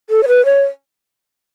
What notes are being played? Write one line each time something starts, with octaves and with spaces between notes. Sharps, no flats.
A4
C#5
B4
C#5